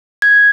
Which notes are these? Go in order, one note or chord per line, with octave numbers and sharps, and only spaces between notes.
G#6